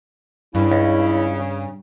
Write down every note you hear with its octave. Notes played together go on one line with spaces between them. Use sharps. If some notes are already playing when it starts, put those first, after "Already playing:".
G2 C#3 E4
C#2